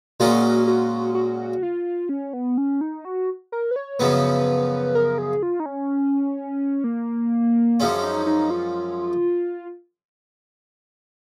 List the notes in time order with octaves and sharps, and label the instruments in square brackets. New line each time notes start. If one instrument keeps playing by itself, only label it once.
[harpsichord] A#2 G#3 C#4 F4 A#4 [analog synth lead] F#4
[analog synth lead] F#4
F#4
F4
C#4
B3
C#4
D#4
F#4
A#4
B4
C#5
[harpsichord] F#2 C#3 F3 B3 [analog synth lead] B4
[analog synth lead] A#4
G#4
F4
D#4
C#4
A#3
[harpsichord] F#2 F3 G#3 C#4
[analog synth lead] D#4
D#4
F4